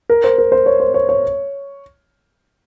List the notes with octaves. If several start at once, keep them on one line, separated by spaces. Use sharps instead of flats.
A#4
C5
A#4
C5
C#5
C5
C#5
C#5